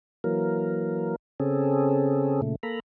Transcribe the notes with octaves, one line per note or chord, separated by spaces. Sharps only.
E3 F#3 A#3 A#4
C#3 C4 C#4 G#4 A4
A#2 C#3 A3
A#3 A4 A#5 B5